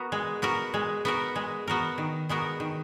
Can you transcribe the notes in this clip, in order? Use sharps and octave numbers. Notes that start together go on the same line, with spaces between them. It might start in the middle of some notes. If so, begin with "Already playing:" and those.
Already playing: B3 F#4 A#4
G#3
B3 F#4 A#4
G#3
B3 F#4 A#4
G#3
B3 F#4 A#4
D#3
G#3 B3 F#4 A#4
D#3